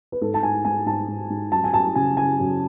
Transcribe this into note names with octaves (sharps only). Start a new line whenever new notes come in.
B4
G#2 A4
A5
G#2 G#5
G#2 G#5
G#2 A5
G#2
G#2
F#2 A5
G#5
F#2 A5
C#3 G#5
C#3 G#5
F#2